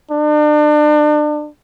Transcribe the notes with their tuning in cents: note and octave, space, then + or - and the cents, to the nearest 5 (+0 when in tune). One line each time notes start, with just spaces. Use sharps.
D4 +35